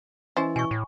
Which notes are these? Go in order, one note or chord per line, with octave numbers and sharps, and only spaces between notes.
E3 C#4 E4 C5 D#5 G#5
B2 G#5 C#6
A2